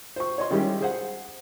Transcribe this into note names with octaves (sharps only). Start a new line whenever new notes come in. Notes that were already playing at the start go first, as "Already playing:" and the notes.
C5 C#6
C#5 D#5 C6
D#3 G3 G#3 C#4 E4 G4
G#4 C5 F#5